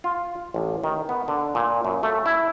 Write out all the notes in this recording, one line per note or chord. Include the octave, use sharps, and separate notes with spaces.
F4
A1
D#3
B3
D3
A#2
F#2
A3
E4